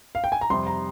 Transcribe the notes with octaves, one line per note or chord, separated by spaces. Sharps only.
F5
G5
G#5
A#5
F2 C3 G3 C6
A#5